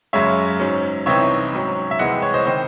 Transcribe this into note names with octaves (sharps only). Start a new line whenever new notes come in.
F#2 C#3 G#3 C#5 E5
G#2 F#3 C#4
C2 C3 E3 C4 D#4 C#5 E5
G#2 F#3 C#4
E5
C2 C3 E3 G#3 D#5 F#5
C#5
C5 D#5
C3 D#3 C5 D#5